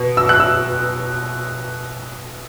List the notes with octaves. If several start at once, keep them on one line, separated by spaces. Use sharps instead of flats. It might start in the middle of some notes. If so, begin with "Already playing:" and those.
Already playing: B2
E6
F#6
E6